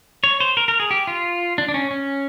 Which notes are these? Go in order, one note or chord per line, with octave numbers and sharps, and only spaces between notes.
C#5
C5
A#4
A#4
G#4
G4
F4
D4
D4
C#4
C#4